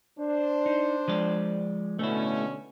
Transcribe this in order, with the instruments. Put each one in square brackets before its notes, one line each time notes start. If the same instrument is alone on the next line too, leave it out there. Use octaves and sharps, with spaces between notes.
[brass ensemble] D4 C5
[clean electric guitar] D#4
F3 G#3 D5
[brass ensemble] B2 D3 C#4 [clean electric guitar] A3 E4